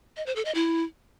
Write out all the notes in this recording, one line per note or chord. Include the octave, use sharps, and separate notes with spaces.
D#5
C5
A4
D#5
E4